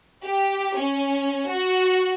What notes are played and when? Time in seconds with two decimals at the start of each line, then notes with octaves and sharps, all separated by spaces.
0.23 G4
0.76 C#4
1.49 F#4